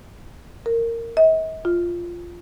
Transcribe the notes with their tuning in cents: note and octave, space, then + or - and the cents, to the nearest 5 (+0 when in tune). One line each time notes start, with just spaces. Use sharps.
A#4 -15
D#5 +45
F4 -5